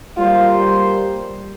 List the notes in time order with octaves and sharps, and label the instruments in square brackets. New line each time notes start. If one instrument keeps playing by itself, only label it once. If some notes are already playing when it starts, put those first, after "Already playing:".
[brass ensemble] G3 A#3 G4 C5 [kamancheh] F4